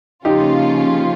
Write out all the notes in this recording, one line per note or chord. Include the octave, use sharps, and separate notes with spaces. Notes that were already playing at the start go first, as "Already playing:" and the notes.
C#3 F3 A#3 C#4 D#4 F4 G4